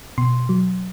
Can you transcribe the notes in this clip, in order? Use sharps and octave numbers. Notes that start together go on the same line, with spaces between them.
B2 C6
F#3